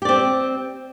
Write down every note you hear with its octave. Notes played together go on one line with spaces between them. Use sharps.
C4 G4 D5